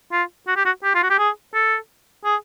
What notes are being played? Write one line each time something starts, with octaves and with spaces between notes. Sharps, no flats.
F4
F#4
G4
F#4
G4
F4
F#4
G4
G#4
A4
G#4